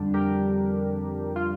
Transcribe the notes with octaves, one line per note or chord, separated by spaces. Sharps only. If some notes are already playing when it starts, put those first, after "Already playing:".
Already playing: F2 D3 G3 D4
G4 A#4
F4